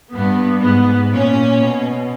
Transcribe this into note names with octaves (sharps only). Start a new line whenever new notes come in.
G2 B3
G#2 B3
A#2 C#4
B2